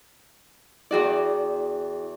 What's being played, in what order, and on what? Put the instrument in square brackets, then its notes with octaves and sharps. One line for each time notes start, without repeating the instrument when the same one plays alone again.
[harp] E2 F#4 D5 [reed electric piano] E4 G#4 G5